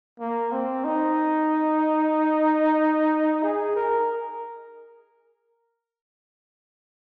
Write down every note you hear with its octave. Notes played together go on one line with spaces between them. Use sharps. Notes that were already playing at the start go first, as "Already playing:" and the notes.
A#3
C4
D#4
G#4
A#4